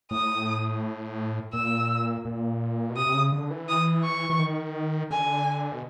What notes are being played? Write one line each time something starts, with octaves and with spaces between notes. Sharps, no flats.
A2 D#6
A#2 E6
A#2
B2
C3 D#6
C3
C#3
D3
E3
D#6
C#6
E3
D#3
D3 G#5
B2